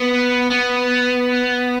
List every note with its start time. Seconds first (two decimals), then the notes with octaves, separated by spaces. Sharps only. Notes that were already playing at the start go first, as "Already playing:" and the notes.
Already playing: B3
0.50 B3